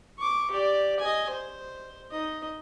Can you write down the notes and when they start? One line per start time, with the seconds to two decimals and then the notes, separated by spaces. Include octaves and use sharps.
0.18 C#6 D6
0.51 G4 D5
1.00 D#5 G#5
1.30 C5
2.11 D#4 D#5